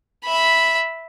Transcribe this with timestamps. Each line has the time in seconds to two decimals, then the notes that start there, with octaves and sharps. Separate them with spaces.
0.25 E5 B5